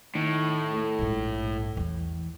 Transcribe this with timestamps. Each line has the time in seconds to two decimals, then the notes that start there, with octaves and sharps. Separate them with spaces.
0.15 A2 D#3
0.73 A3
0.99 A#1 G#2
1.77 E2 E3